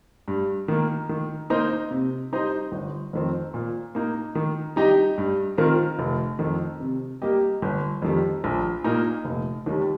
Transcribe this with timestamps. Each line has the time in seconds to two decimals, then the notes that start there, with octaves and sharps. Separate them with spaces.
0.28 G2
0.68 D#3 A#3
1.09 D#3
1.50 A#3 D#4 C5 D#5
1.91 C3
2.32 G3 D#4 C5 D#5
2.72 G1
3.13 F2 D#3 C4
3.54 A#2
3.95 A#3 D#4
4.35 D#3
4.76 G3 D#4 G4 D#5
5.18 G2
5.58 D#3 C4 F4 A#4
5.99 F1
6.39 F2 D#3
6.80 C3
7.22 G3 A#3 G4 D#5
7.62 G1
8.02 F2 D#3 G3
8.44 A#1
8.84 A#2 A#3 D#4
9.25 F1
9.66 D#2 D#3 G3